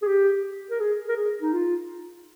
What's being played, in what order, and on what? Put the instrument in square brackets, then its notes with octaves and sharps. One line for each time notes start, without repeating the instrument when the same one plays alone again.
[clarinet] G#4
G4
A#4
G#4
A#4
G#4
D#4
F4